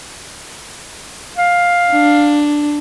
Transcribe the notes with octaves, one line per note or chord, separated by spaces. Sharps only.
F5
D4